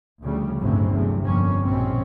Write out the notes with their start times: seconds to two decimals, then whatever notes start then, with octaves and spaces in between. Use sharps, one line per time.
0.22 D2 C#3 F3 G3
0.59 G1 A2 C#3 F#3 G#3 C4
0.93 E2 C3 F#3 A3
1.23 G1 F2 G3 A#3 C#4
1.64 A#1 G#2 B2 C4 C#4